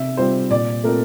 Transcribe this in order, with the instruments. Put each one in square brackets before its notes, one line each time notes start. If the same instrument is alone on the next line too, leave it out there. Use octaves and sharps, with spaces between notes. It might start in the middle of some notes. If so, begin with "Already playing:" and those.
Already playing: [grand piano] C3 [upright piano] E5
[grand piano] G3 C4 F4 [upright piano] C5
[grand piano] A#2 [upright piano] D5
[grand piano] A3 C4 F4 [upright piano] A#4